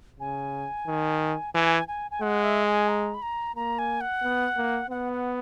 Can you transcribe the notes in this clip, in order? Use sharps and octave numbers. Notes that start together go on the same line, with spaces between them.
C#3 G#5
D#3
E3 G#5
G#5
G#5
G#3 F#5
E5
G#5
A#5
B5
A#5
A#3 A#5
G#5
F#5
B3
A#3
B3 F#5
F#5